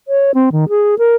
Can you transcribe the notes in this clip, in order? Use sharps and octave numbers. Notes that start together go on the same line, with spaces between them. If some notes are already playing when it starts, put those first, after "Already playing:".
C#5
C4
D#3
G#4
A#4